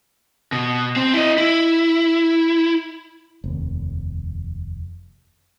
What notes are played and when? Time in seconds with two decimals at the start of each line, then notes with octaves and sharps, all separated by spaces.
0.52 B2
0.96 C4
1.13 E4 D#5
1.38 E4
3.44 F1 D#2